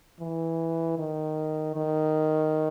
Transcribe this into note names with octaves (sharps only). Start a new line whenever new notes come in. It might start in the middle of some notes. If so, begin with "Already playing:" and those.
E3
D#3
D#3